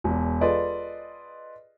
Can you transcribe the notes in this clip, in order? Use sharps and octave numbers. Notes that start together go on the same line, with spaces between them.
E1 E2
F4 G#4 A4 B4 D5 D#5